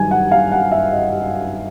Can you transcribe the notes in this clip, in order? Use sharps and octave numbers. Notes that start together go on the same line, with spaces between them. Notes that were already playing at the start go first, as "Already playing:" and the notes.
Already playing: G2 D#3 F#3 G#5
F#5
F5
F#5
E5
D#5